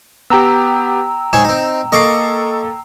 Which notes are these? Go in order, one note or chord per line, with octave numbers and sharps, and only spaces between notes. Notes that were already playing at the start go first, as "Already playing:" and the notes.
B3 G4 G5 A#5 E6
G#2 G#4 C#5 E7
C4 D#4
A#3 A4 D#5 C#6 D6 C7